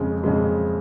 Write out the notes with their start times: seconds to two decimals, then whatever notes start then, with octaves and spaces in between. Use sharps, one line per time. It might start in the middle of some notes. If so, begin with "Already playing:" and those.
Already playing: F2 C#3 G#3
0.24 F2 C#3 G#3